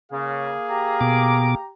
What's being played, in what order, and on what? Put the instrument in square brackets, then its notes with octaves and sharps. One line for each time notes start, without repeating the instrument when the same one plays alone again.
[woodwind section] C#3 [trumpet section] A#3 G#4 F5
[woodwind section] G4 A#5
[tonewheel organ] B2 D6